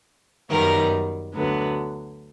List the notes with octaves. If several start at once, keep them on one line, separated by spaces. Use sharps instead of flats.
F#2 D#3 G3 B3 A#4
D2 D3 F#3 B3